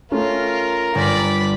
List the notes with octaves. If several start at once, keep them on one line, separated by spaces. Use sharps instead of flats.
A3 C#4 F4 A#4
G1 D5 B5